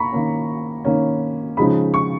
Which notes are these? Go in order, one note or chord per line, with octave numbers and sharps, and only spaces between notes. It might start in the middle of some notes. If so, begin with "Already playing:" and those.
Already playing: A#3 A#5 B5 C#6
D#3 A#3 C#4
D#3 A#3 C#4
C#3 F3 G#3 D#4 B5
C#6